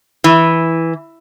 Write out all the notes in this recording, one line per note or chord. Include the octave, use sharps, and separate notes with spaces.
E3